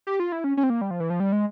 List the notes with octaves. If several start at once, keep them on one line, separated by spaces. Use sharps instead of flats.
G4
F4
E4
C#4
C#4
C4
A#3
G3
F3
E3
F3
G3
G#3